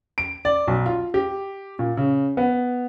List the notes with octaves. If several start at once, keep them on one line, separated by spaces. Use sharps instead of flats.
D7
D5
B1
F4
G4
A#2
C#3
B3